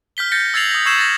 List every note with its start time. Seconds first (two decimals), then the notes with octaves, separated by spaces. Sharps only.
0.17 F6 G6 B6 G7
0.32 G6 A6 A#6 C#7
0.54 E6 G#6 A6 C7 F7 F#7
0.71 D#6 A#6
0.86 C#6 E6 G#6 C7 E7 F#7
0.98 A6 A#6